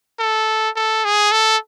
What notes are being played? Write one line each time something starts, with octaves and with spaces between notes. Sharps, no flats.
A4
A4
G#4
A4